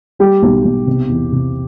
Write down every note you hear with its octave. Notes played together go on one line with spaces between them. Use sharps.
G3 G4
B1
B1
C3
E2
C3